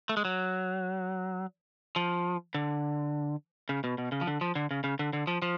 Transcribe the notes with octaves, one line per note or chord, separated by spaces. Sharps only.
A3
G#3
F#3
F3
D3
C#3
B2
B2
C#3
F3
D3
F3
D3
C#3
C#3
D3
D3
F3
F3